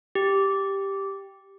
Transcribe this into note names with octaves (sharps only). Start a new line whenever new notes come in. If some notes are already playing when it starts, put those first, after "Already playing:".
G4